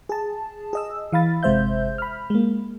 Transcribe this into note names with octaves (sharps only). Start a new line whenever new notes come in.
G#4 A5
G#4 D#5 E6
E3 F5 B5 A6
G1 C3 G#3 C5 E5 G6
B5 F6
G#3 A#3